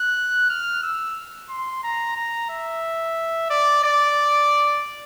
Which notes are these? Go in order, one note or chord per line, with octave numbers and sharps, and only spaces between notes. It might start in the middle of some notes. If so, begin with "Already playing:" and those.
Already playing: F#6
F6
E6
C6
A#5
A#5
E5
D5
D5